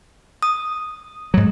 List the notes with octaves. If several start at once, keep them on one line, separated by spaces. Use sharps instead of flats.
D#6
G#2 F#3